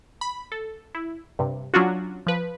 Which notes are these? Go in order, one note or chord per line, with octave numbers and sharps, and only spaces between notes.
B5
A4
E4
G2 C3
F#3 C#4 D4 F4 F#4
F3 B4